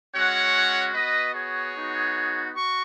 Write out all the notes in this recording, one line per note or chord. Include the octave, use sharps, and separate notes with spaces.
G#3 C#4 F#4 C#5 F#5
B3 F#4 B4 D#5
G#4 C#5
B3 D#4 F#4
F#4 C#6